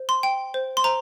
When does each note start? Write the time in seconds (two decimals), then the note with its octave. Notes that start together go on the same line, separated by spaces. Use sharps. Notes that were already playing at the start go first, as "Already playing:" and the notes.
Already playing: C5
0.09 C6
0.23 G5
0.54 C5
0.77 C6
0.84 C5 A#5